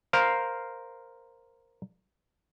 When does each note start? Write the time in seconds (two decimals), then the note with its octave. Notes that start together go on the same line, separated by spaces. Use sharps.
0.13 A#4 C5 F5